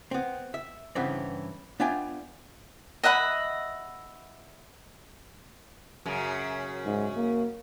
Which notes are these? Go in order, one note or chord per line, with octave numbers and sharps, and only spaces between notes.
B3 C4
E5
G2 C#3 E3 B3 C4
B3 D4 F4 E5 G5 G#5
D#5 E5 F#5 B5
F#2 C#3
G#2
A#3